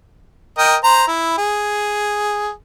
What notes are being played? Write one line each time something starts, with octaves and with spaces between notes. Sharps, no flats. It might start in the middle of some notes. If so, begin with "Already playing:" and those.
A#4 D#5 G5
C5 A#5
E4
G#4